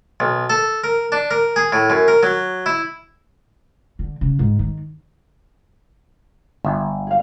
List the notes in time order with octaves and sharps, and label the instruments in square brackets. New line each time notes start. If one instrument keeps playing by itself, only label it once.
[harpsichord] B1
A4
A#4
D4
A#4
G#4
A2
F#2
A#4
F#3
E4
[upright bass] D3
C#3
G#2
D#3
[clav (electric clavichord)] G1 [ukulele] E5
[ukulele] G#4 F5